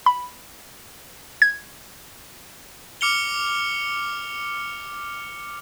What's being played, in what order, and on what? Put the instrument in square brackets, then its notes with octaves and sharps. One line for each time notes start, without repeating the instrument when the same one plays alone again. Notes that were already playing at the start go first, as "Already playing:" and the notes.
[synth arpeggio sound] B5
G#6
[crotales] D6 F6 C#7 F7 G7